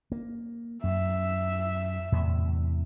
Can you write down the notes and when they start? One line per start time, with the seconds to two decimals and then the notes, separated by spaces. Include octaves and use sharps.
0.12 A#3
0.84 F#2 E5
2.12 E2 A2 C3